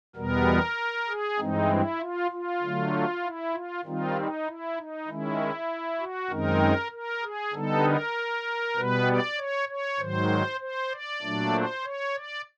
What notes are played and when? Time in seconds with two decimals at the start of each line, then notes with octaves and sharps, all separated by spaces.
0.16 E2 B2 G3 B3 A#4
1.08 G#4
1.39 G2 E3 G#3 C4 D#4
1.69 E4
2.00 F4
2.31 F4
2.62 D3 F#3 A3
3.23 E4
3.53 F4
3.85 D#3 G3 C4 D#4 F4
4.16 D#4
4.46 E4
4.77 D#4
5.07 D#3 G#3 C#4 E4
5.99 F#4
6.30 F#2 D#3 G#3 C4 D#4 A#4
6.92 A#4
7.22 G#4
7.53 D3 G3 B3 D#4 A4
7.84 A#4
8.76 B2 G3 B3 B4
9.07 D5
9.38 C#5
9.69 C#5
9.99 G#2 D#3 F#3 C5
10.60 C5
10.91 D5
11.22 A#2 F#3 A3 D4
11.53 C5
11.84 C#5
12.15 D5